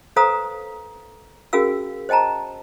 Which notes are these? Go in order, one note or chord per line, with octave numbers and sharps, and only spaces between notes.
A4 B4 C5 F5 A#5 D#6
C#4 F#4 G#4 A#4 F5 E6
C5 D#5 G5 A5 A#5